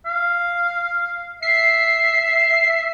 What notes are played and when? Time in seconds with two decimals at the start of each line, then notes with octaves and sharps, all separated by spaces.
0.06 F5
1.43 E5 C7